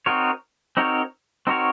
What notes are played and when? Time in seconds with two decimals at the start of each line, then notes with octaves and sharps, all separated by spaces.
0.06 C4 D#4 F#4 A#4 C#5
0.77 C4 D#4 F#4 A#4 C#5
1.47 C4 D#4 F#4 A#4 C#5